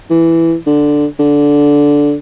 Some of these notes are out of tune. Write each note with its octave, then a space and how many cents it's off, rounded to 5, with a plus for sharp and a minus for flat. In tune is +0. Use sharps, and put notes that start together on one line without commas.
E3 +5
D3 +5
D3 -10